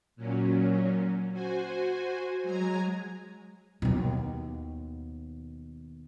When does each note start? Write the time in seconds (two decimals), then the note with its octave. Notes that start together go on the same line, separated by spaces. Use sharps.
0.16 A#2 F#3 C#4
1.33 F#4 C5 G#5
2.43 F#3 G#3 G#5 A#5 G#6
3.82 D#2 B2